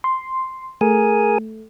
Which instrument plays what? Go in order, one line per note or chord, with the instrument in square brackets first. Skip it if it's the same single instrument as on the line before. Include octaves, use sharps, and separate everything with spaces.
[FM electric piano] C6
[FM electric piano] A3 [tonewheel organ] G#4 A#4 G#5